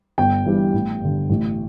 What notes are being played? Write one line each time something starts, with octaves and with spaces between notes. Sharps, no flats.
G1 G5
G2 E3 G3
A1
G2 D3
A1